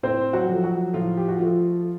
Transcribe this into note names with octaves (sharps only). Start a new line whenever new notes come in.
A2 C4 C5
F#3 F#4
F3 A3
F#3 F#4
A2 F3 F4
G4
F#4
F3 A3 F4